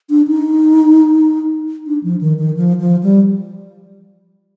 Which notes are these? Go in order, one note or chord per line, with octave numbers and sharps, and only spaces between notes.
D4
D#4
D4
F3
D#3
D#3
F3
F3
G3